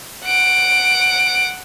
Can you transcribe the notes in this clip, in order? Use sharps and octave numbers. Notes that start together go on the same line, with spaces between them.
F#5 D7